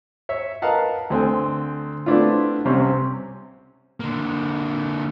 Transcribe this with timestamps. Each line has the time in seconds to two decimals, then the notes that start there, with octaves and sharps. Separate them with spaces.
0.29 C#5 E5
0.62 A#4 B4 D#5 F5 F#5 A5
1.10 D2 C4 A4 G#5
2.06 A3 B3 C4 D4 E4 F4
2.65 C2 C3 C4 C#4 C#6
4.00 D3 A#3